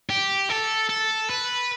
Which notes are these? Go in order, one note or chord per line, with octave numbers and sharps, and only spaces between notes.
G4
A4
A4
B4